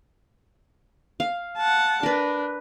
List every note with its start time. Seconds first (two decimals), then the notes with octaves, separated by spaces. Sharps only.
1.20 F5
1.57 F#5 A5
2.03 D4 A#4 B4